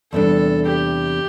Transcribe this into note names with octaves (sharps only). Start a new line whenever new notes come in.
E2 C3 G3 D4 A4
G4